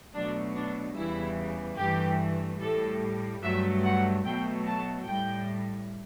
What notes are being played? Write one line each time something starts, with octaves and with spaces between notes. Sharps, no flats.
B2 F#3 A3 D4
D4
E2 C#3 E3 G3 E4
G2 E3 A3 G4
A2 G3 A4
G2 F#3 A3 E5
F#5
B2 F#3 A3 G5
A5
A2 G3 G5